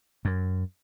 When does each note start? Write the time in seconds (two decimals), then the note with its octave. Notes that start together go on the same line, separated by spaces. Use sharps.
0.25 F#2